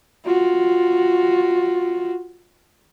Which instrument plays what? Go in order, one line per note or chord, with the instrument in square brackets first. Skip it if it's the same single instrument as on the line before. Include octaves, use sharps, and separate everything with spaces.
[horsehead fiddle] F4 F#4